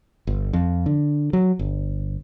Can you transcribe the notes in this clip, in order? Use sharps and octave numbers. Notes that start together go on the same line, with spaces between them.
G1
F2
D3
F#3
G1